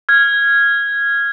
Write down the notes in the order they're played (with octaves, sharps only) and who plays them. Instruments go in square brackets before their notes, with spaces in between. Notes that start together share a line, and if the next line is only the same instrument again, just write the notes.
[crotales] F6 G#6